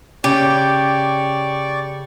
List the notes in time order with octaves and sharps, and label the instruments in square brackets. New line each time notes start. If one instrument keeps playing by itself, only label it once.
[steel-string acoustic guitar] C#3 [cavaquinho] G4 [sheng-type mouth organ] D5 C#6